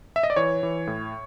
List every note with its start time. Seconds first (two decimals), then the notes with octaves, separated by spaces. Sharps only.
0.16 E5
0.23 D#5
0.30 D5
0.36 E3 C#5
0.63 E3
0.87 A2